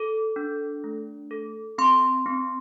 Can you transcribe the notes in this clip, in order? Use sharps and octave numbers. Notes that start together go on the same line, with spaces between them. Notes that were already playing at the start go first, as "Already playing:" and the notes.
Already playing: A4
D4
A3
A4
C4 C6
C4